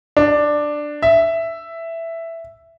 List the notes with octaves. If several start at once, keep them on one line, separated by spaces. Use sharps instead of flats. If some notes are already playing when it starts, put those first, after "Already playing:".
D4
E5